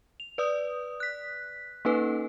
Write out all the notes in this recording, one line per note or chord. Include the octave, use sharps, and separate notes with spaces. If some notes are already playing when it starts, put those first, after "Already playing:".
F7
B4 D5 D#6
F#6 B6
A#3 C#4 D#4 A4 B4